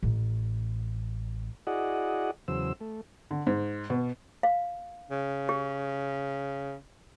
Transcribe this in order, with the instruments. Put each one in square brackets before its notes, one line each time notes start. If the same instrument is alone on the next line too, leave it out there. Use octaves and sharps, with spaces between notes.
[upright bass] A1
[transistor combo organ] E4 F#4 G#4 D5 D#5 F#5
E2 C#3 F#3 C5 E6
A3
[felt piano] D3
G#2
B2
[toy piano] F5
[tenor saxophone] C#3
[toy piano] G4